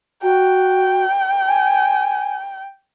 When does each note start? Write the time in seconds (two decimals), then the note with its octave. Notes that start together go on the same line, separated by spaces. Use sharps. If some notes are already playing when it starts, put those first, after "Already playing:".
0.23 F#4 G5
1.47 G#5